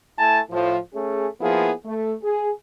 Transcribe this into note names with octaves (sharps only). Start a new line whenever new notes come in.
A3 E4 G#5 A5
A2 F3
A3 C#4 G#4
F3 A#3 B3 E4 G#4
A3
G#4